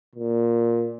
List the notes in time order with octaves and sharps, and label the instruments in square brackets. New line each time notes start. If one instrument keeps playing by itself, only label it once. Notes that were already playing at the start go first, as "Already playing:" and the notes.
[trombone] A#2